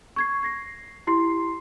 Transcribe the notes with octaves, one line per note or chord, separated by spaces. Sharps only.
C#6 G#6 C7
G#6 A#6 C7
E4 G4 C6 C7